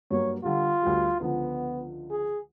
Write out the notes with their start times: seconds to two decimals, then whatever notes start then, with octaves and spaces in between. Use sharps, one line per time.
0.11 G2 F#3 A#3 C#5
0.43 D3 G3 F4
0.82 D2 G3
1.20 C#2 D3 F3 B3
2.11 G#4